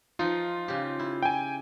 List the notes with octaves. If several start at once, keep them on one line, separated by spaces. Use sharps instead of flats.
F3 D#4 F4
C#3 G4
E4
G5 G#5